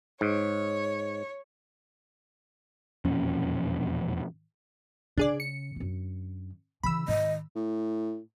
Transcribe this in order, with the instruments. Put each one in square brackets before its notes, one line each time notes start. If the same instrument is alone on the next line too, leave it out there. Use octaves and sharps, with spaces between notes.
[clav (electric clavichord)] G#2 [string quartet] C#5
[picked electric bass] E1 F2 A#2 C#4
[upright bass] C#3 [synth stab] D4 G#4 D5
[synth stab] C#7
[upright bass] F#2 D3
[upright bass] C#3 E3 [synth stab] B5 E6
[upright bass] G#2 D#3 [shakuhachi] D#5
[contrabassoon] A2